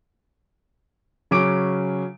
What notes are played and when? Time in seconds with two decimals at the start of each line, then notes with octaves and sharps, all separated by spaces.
1.31 C#3 F#3 C#4 D6 D7